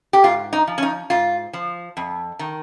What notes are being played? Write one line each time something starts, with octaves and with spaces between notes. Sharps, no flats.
G4
G#2 F4
D#4
F3
C#4
D#4
G#2 F4
F3
F2
D#3